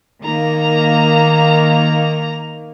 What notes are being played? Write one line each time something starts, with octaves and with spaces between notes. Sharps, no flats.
D#3 A#3 A#5